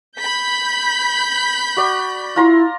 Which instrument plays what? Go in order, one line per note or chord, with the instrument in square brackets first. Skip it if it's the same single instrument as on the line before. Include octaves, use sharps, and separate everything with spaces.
[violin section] B5 G6 B6
[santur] F#4 D5
[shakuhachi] E4 [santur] F4 A#5 C6